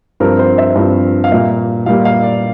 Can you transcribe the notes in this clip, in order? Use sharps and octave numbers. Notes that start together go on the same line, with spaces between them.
G2 F3 C4 A#4
C5
E5
G2 F3 C4
F5
A#2 G3 A#3 E5
A#2 G3 A#3 F5
F5
D5